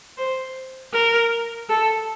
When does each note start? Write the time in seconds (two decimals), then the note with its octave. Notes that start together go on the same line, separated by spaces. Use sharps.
0.18 C5
0.93 A#4
1.69 A4